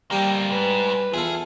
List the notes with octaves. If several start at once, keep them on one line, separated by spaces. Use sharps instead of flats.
G3 A#3 C4 G4
G#2 B4
E2 F4 G#4 A4